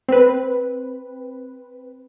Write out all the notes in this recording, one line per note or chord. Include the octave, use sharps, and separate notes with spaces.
C4 B4